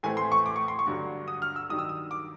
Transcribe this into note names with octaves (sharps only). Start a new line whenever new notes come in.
A2 E3 A3 C4 G#5
C6
C#6
D6
C#6
C6
C#6
G2 D3 F#3
D#6
F6
E6
G2 D#3 F#3 D#6
E6
D#6
D6